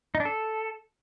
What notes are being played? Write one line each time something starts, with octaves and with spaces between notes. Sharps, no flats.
D#4
D4
A4